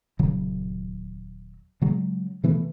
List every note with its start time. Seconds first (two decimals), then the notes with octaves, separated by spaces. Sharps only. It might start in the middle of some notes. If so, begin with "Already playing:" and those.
0.19 D#1 C#3 F#3
1.81 C#3 F#3 G#3
2.43 C3 E3 A3 B3